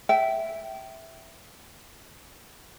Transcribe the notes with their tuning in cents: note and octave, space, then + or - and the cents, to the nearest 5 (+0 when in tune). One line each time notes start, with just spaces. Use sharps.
E5 +0 G5 -25